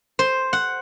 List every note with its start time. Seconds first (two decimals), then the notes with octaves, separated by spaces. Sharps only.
0.19 C5
0.53 F#5